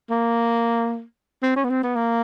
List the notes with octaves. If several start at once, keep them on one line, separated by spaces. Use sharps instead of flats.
A#3
C4
C#4
B3
C4
B3
A#3